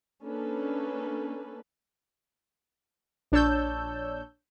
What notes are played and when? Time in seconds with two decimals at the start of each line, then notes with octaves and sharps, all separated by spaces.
0.22 A#3 C#4 D4 A4 B4
3.32 A#1 D4 C#5 A5 E6 G6